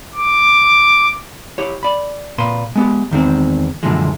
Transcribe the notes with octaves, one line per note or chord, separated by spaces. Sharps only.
D6
E4 G4 C#5
D5 B5
A#2 B4 C6
G#3 B3 G4
E2 D#3 G#3 C4
F#2 A#2 D3 E3 F3 G#3